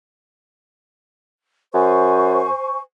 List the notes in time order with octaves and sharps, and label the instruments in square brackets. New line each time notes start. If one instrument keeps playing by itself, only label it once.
[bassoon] F#2 [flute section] C5 G#5 C#6